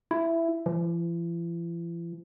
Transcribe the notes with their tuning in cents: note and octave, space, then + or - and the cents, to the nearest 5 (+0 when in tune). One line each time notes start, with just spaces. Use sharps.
E4 +10
E3 +45